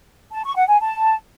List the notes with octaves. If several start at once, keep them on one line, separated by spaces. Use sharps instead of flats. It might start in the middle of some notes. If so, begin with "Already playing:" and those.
A5
C#6
F#5
G#5
A5